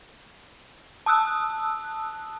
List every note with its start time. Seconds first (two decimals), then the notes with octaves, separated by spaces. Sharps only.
1.06 A5 D#6 E6 F#6